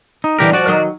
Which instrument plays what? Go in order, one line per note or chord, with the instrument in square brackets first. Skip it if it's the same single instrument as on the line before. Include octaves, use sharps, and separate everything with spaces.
[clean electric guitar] D#4
[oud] D3 G3 D4 [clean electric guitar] E3 G4 A#4
[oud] F3 [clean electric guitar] F#4 D5
[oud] D#3 F#3 D#5